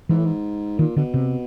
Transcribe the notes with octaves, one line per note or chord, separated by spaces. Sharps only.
G#2 E3
A2
G#2
A#2 D#3
B2 D3
C3